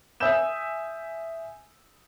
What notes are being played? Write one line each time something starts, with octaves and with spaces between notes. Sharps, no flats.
E5 G#5 D#6 E6 G6 E7